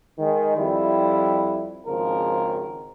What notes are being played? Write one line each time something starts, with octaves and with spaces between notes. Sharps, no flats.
D#3 G#3
F2 G3 E4
G#1 C#3 F3 A#4